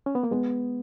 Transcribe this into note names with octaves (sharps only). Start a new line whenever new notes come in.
C#4
B3
A#3
G#3 B3